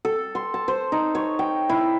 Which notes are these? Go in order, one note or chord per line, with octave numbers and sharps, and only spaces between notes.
A4
C6
A5
C5
D#4
C#5
G5
E4